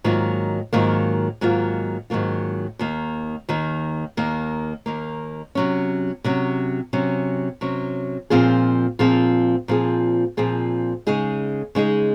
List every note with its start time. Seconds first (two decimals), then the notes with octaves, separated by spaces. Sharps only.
0.04 G#2 D#3 F#3 A#3 F4
0.73 G#2 D#3 F#3 A#3 F4
1.41 G#2 D#3 F#3 A#3 F4
2.10 G#2 D#3 F#3 A#3 F4
2.79 D#2 D#3 A#3
3.49 D#2 D#3 A#3
4.17 D#2 D#3 A#3
4.86 D#2 D#3 A#3
5.55 C3 F#3 C#4
6.24 C3 F#3 C#4
6.93 C3 F#3 C#4
7.61 C3 F#3 C#4
8.30 A#2 F3 C4 F4 G#4
8.99 A#2 F3 C4 F4 G#4
9.68 A#2 F3 C4 F4 G#4
10.37 A#2 F3 C4 F4 G#4
11.07 C#3 G#3 D#4 G#4
11.75 C#3 G#3 D#4 G#4